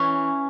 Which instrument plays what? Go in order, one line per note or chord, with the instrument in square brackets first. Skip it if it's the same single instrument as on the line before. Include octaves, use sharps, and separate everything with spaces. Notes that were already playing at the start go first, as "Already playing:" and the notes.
Already playing: [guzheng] E3 C#4 E4